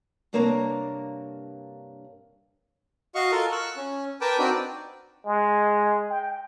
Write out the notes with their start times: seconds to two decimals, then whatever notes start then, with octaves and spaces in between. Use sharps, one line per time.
0.33 G2 C3 A#3 D4 C#5 A#5
3.15 F#4 D#5 F5 C#6
3.31 F4 A4 A#4
3.52 C#6 E6 F#6
3.76 C#4
4.21 A#4 B4 G5 A5 D6
4.38 C4 D4 D#4 F#4 D5 G5
5.26 G#3
6.10 G5